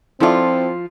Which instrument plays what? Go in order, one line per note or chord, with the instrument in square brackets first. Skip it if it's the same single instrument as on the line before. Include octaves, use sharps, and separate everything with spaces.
[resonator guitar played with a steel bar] F3 F4 [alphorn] C4 [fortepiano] E4 A4 D5